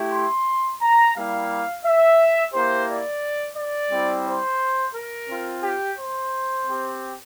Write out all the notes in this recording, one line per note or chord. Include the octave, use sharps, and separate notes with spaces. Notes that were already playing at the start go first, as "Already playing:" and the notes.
Already playing: A3 E4 G4
C6
A#5
G3 A#3 E4 G4 F5
E5
A#3 E4 G4 C5
D5
D5
G3 C4 E4
C5
A#4
C4 F4
G4
C5
C4 G4